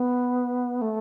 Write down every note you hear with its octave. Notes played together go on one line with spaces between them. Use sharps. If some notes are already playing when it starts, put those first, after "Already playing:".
Already playing: B3
A3